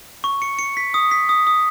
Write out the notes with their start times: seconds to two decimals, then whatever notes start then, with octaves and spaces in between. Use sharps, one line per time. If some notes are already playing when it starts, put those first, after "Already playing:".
0.24 C#6
0.42 C#7
0.59 C#7
0.77 B6
0.94 D#6
1.11 B6
1.29 D#6
1.47 D#6